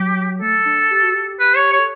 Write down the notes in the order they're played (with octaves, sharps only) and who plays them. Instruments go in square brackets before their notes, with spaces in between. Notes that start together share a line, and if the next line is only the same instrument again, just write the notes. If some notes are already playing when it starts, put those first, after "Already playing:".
Already playing: [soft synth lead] F#3 [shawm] G4
[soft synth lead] A3 [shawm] A4
[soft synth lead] D4
G4
F#4
G4
[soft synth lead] G4 [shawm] B4
[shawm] C#5
C#5
[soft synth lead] A4